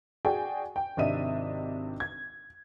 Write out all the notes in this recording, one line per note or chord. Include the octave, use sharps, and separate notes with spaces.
F#4 G#4 D5 G5 G#5
G5
G#1 C3 D4 D#5 E5 D#7
G#6